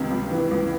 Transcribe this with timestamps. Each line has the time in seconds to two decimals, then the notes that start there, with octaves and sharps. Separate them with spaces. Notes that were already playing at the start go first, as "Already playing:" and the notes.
Already playing: C#2 C3 D#3
0.11 C#2
0.31 E3
0.51 C#2